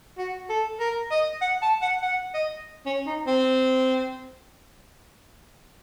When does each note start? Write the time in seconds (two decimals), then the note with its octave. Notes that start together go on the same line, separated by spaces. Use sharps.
0.18 F#4
0.49 A4
0.80 A#4
1.11 D#5
1.41 F#5
1.62 A5
1.82 F#5
2.02 F#5
2.34 D#5
2.86 C#4
3.06 D#4
3.27 C4